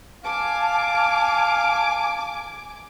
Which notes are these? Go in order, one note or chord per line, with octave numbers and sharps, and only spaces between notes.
F5 G#5 A5 D6